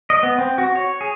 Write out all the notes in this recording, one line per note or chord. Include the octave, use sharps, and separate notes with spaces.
D#5
B3
C4
F#4
C#5
G#4